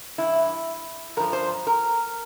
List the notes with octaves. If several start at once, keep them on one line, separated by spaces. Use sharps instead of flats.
G2 E3 E4
G2 F3 A#4
C5
A#4